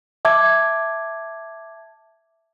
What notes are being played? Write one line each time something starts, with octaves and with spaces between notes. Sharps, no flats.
E5 A5 D6 G#6